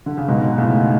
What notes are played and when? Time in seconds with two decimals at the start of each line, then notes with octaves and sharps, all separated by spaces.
0.06 D3
0.18 C#3
0.28 G#2 B2
0.58 A2 C#3